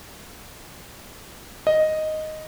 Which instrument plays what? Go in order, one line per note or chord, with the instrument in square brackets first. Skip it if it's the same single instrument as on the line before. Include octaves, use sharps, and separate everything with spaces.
[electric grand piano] D#5